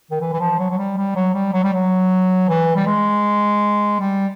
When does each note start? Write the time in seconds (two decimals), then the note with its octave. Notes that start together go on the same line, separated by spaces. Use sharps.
0.11 D#3
0.21 E3
0.33 E3
0.40 F3
0.59 F#3
0.70 F#3
0.78 G3
0.97 G3
1.15 F#3
1.34 G3
1.53 F#3
1.64 G3
1.73 F#3
2.49 E3
2.76 G3
2.86 G#3
4.00 G3